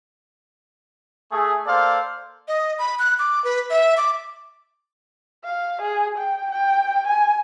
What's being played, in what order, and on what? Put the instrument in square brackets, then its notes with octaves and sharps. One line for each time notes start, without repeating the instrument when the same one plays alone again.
[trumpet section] A3 G#4
A#3 A4 C5 D5 F5
[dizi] D#5
B5
F#6
D6
B4
E5
D6
[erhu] F5
G#4
G5
G5
G#5